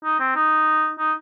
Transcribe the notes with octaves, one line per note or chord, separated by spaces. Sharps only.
D#4
C4
D#4
D#4